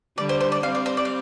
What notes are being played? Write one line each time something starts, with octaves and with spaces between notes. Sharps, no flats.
D3 G3 D5
C5
C5
D5
G3 C4 F5
D5
C5
D5
F5